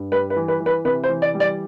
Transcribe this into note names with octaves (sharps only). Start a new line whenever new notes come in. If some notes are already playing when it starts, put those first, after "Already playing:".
Already playing: G2
G3 B4
B4
E3
B4
E3
B4
C3 B4
C5
E3
D5
G3
D5